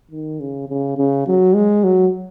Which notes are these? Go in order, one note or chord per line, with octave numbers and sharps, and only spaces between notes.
D#3
C#3
C#3
C#3
F#3
G#3
F#3